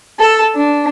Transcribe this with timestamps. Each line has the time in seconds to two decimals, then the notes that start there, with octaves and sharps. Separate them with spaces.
0.19 A4
0.55 D4